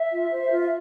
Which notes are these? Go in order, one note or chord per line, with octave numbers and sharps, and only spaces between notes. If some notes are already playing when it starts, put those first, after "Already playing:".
Already playing: E5
F4
C5
F4